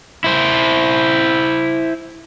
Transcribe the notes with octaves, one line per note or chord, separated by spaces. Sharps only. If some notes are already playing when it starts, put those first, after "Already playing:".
E4 C5